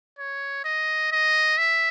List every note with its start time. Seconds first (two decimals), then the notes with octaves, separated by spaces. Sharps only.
0.19 C#5
0.64 D#5
1.12 D#5
1.58 E5